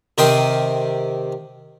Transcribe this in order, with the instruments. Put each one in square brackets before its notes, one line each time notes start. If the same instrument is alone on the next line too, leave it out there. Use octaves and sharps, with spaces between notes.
[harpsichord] C3 D#3 A#4 G5 C6 D#6